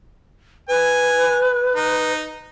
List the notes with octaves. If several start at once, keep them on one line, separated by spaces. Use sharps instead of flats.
B4 G#5
D#4